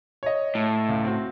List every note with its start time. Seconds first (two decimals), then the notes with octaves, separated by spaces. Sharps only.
0.23 C#5 D#5
0.55 A2
0.89 C#2
1.04 C4 F#4